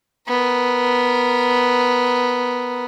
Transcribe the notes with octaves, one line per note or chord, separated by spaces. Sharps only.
B3 A#4